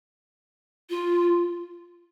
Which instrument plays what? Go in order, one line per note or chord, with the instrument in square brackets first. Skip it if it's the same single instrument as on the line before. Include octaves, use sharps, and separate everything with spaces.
[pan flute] F4